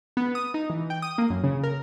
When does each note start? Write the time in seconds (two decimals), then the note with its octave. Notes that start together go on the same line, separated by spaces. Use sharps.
0.17 B3
0.35 D#6
0.54 D#4
0.70 E3
0.90 G5
1.02 D#6
1.18 A#3
1.30 F#2
1.44 C#3
1.63 A#4